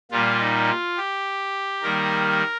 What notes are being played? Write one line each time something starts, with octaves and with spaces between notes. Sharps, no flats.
A#2 G3 A#3 F4
D#4
F4
G4
D#3 G3 A#3 A#4